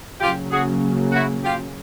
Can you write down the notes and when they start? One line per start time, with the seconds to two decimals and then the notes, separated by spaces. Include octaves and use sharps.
0.21 C#3 F#3 A#3 C#4 F4 G4
0.51 F#4 G#4
1.12 E4 F#4
1.43 F4 G4